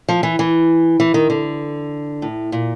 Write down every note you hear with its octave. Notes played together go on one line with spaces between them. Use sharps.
F3
E3
E3
E3
D#3
D3
A2
A#2